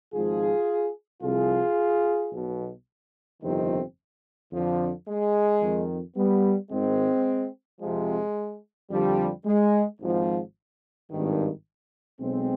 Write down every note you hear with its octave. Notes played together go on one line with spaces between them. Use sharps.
G#1 G#2 F3 F4 G#4
C2 C3 F3 F4 G#4
B1 B2
G1 F2 C3 D#3 C4 D#4
F2 D3 F3
G#3
F2 D#3
G3 B3
G#1 G#2 D#3 G#3 C4
F2 C3 F3 G#3
F2 D3 F3 G3
G#3
G#1 G#2 F3
G#1 G2 D#3
B1 B2 G#3 C4